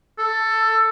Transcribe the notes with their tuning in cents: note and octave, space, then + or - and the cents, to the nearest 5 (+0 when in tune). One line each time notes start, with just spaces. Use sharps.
A4 +10